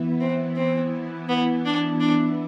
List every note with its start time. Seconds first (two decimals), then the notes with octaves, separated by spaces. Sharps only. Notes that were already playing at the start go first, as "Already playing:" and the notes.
Already playing: E3 B3 E4
0.20 C4
0.57 C4
1.29 B3
1.65 D4
2.00 D4